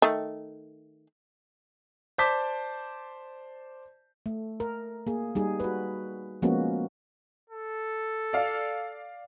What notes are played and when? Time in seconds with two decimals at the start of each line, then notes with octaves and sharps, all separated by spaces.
0.02 D#3 A3
2.18 C5 D5 A5 D6 G6 B6
4.26 A3
4.60 A#4
5.07 A#3 G#4
5.35 G3 D#4 G#4
5.60 F#4 B4
6.42 F3 G#3 A#3 B3 C#4 F#4
7.50 A4
8.33 D5 F5